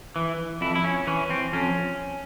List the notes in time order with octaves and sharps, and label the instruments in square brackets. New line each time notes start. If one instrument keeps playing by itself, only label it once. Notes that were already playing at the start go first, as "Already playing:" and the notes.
[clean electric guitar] E3
F2 E4
E4
C#4
E3 C#4
C4
F2 C#4